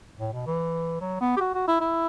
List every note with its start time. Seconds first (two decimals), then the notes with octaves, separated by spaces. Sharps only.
0.19 A2
0.33 B2
0.46 E3
1.01 F#3
1.21 B3
1.36 G4
1.40 F#4
1.54 F#4
1.67 E4
1.80 E4